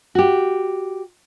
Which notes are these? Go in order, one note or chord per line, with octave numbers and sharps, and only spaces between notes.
F#4 G4